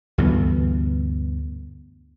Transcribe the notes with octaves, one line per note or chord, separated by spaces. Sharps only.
D2 G2 E3 B3